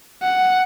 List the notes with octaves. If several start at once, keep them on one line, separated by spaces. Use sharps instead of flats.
F#5